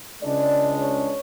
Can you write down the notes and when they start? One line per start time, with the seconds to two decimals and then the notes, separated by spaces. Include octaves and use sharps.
0.23 C#2 C#3 G#3 D4 D5
0.81 C#5